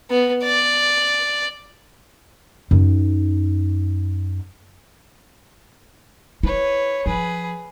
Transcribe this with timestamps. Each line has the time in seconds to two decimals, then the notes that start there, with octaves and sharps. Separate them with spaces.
0.10 B3
0.44 D5
2.71 F#2 D#4
6.43 E4 B4 C#5
7.06 F3 G#4 B4